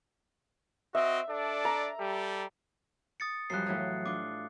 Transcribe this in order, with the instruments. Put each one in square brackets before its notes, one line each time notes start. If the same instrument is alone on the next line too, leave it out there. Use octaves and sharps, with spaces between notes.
[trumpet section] C4 F#4 D#5 [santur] E5
[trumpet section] D4 A4 D5
[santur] A#5
[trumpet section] G3 G4 A4
[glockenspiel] D#6 A6 C#7
[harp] F#2 F3 G3 [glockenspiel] F#6 C7
[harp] A2 E3 F#3
[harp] D4 F4 [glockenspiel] D6